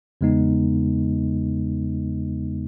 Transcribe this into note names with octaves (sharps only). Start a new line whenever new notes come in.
E2 C#3 G#3 B3 D#4